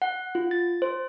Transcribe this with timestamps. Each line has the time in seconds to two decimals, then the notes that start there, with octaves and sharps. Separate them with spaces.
0.02 F#5
0.35 F4
0.51 A6
0.82 C5